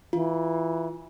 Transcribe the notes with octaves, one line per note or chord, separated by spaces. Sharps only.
E3 F4